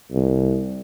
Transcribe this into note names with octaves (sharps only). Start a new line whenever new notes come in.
C2